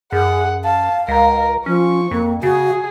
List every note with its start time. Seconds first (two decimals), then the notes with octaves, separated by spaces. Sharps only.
0.12 F#2 G#4 F#5
0.64 F5 A5
1.08 C#2 A#4
1.66 F3 C#4 C#6
2.11 F2 A#3
2.43 C#3 F#4 G#4